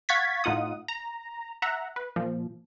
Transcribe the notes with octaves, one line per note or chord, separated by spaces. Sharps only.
F5 F#5 C#6 G#6 A6 B6
A2 D#4 F4 F#5 D#6
A#5
E5 F#5 A#5
B4
A#2 F3